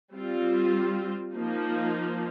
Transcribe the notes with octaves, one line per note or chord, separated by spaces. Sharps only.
G3 C4 F4
F3 A#3 D#4